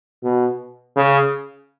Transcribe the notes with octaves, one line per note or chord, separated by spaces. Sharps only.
B2
C#3